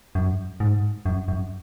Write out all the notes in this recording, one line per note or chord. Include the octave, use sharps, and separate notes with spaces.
F#2
G#2
F#2
F#2